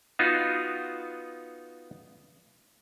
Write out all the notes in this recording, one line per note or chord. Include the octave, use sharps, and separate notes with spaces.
B3 D#4 F4 F#4